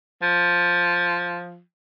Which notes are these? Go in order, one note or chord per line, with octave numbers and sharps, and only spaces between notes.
F3